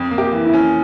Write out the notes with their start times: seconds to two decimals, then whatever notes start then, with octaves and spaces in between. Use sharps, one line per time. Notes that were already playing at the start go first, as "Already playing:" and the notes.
Already playing: F2
0.11 A#3
0.18 G4
0.32 E3
0.46 E4
0.53 C#4